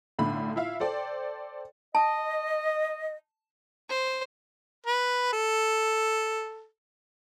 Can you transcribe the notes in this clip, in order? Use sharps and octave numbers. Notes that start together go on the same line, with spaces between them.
B1 A2 D3 B5
E4 F4 E5 F5
A4 C5 D5 G5
D#5 A5
C5
B4
A4